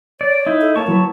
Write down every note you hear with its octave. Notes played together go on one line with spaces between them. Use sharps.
C#5 D5
D#4 E4
A4
A#3 C#5 A5 C#6
F#3 A#3 E4 B4